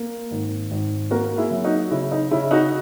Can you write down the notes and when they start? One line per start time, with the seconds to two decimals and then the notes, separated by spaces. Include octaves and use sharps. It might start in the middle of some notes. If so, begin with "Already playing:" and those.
Already playing: A#3
0.31 G#1
0.71 G#1
1.11 A#3 F#4 A#4
1.38 E4 G#4
1.51 F#3
1.64 D#4 F#4
1.91 C#3 E4
2.12 D#4
2.31 C#3 E4
2.51 D#4 F#4